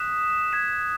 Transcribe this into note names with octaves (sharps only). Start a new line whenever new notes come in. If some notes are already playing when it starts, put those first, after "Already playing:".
Already playing: D#6 F#6 B6 E7
G#6 B6 E7